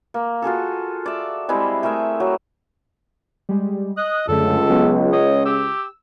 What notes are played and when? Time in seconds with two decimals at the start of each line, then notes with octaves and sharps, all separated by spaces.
0.14 A#3
0.42 F4 F#4 G#4 A4
1.06 D5 E5
1.49 G3 G#3 C4 E4
1.83 A3 G#4 A#4 E5
2.20 F#3
3.49 G3 G#3
3.97 D#5 D#6 F#6
4.28 C#2 F#2 D3 A3 A4
4.69 F#3 B3 C#4
5.12 C#5 D#5
5.45 G4 E6